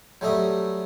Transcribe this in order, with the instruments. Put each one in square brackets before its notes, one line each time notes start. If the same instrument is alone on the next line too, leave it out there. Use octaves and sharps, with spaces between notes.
[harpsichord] F#3 G3 A3 D#5